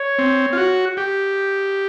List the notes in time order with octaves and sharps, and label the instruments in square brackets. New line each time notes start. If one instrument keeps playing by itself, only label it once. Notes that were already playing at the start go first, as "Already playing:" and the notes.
Already playing: [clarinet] C#5
[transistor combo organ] C4
F4
F#4
G4